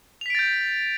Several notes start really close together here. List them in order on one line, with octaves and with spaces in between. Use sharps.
F7 B6 D7 A6 G6